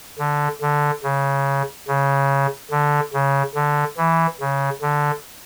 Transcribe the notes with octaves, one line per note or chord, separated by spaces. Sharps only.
D3
D3
C#3
C#3
D3
C#3
D3
E3
C#3
D3